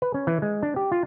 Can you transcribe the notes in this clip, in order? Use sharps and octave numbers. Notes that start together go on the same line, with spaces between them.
B4
C#4
E3
G#3
D4
G4
F4